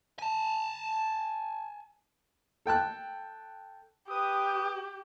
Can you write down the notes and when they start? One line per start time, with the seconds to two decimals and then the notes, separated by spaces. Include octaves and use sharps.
0.19 G#5 A5
2.66 A4 G5 A5 F#6
4.08 G4 B4 D#6